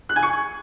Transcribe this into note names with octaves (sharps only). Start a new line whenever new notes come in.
F#6
G#5
C#6